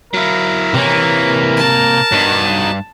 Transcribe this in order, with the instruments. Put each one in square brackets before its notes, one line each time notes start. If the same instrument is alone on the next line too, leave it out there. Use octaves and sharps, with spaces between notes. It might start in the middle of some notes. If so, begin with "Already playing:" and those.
[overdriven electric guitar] F#3 E4 [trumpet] A#4
[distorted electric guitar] C3 A#3 [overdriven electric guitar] E3 [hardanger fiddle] C#5
[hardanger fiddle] A5
[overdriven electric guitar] G2 [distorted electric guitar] F#3 D#4